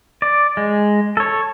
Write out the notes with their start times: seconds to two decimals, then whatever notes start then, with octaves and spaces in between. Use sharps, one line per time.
0.22 D5
0.57 G#3
1.17 A4 C#5